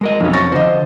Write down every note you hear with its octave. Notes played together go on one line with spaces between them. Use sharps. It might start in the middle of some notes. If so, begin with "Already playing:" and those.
G#3 A#4 D#5
B1 F2 C3 C#4
C#6 A6 A#6
D3 F3 C5 D#5